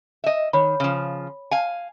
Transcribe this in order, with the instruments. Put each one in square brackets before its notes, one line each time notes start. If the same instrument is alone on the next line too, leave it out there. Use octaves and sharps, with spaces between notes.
[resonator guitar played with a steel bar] D#5 E5
[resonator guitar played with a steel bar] D#3 [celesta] C#5 B5
[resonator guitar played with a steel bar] C#3 F3
F5 G#5